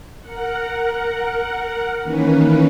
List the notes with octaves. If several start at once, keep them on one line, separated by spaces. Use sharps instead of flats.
A#4 F#5
D#3 E3 A#3 C#4 D#4 B4